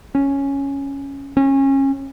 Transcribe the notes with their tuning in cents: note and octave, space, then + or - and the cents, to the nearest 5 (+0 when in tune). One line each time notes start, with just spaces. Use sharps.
C#4 +0
C#4 -25